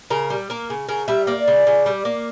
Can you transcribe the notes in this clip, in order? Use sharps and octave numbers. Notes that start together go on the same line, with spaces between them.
C#3 A#4
G3
A#3 A#4
C#3
C#3 A#4
G3 E5
A#3 D5
C#3
C#3
G3
A#3